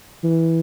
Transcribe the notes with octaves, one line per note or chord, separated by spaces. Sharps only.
E3